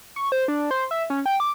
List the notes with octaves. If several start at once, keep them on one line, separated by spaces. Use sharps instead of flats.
C#6
C5
D4
C5
E5
C#4
G5
D6